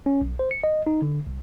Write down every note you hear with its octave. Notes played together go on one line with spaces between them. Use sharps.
C#4
B1
C5
C#7
D#5
D#4
D3
C2